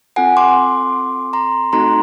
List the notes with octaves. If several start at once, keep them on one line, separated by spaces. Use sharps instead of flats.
C4 F4 A4 F#5 G#5
C6 D6
A#5 C6
A3 C4 D#4 F#4 A4 A#5 C6